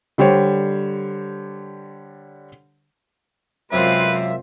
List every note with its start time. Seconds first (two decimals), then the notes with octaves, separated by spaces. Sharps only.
0.18 D3 G3 G4 C5 C#5
3.72 F#2 C3 G#3 A#3 C4 F4 B4 E5